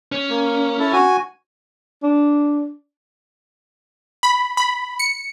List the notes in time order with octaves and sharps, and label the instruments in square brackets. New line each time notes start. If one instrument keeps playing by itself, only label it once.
[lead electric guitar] C#4
[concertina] A#3
E4 A4
F#4 G#5
[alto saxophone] D4
[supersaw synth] B5
B5
C#7